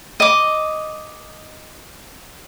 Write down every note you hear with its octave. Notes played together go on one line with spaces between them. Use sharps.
D#5 D6